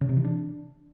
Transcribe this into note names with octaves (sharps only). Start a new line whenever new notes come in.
C#3
C3
E3
D4